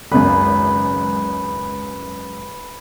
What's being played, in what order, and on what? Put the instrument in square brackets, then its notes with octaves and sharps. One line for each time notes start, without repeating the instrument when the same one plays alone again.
[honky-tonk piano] G#1 C#2 F#2 [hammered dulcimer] B4